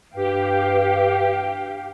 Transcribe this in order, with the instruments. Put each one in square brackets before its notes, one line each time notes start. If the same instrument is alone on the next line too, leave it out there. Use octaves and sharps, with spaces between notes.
[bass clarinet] G2 [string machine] G4 [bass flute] B4 [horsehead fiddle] F5 G5